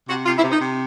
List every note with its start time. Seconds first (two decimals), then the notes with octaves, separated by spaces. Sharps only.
0.08 C3 F#4
0.26 C3 F4
0.38 E4
0.44 C3
0.52 D#4
0.60 C3